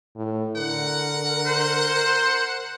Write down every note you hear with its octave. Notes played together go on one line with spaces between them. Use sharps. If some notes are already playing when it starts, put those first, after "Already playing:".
A2
D3 A#4 F#5
C5